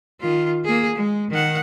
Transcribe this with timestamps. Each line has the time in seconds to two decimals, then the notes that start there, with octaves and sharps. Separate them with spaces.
0.20 D#3 F4
0.65 A#3 G#4
0.96 G#3
1.31 D#3 F#5